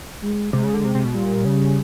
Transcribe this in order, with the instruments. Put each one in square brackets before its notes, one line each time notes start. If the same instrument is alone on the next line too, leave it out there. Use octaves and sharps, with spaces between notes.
[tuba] G#3
[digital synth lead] C3 [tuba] G#3
[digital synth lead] C#3
D3
C3
C3
B2
[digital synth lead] A#2 [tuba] G3
[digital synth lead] C#3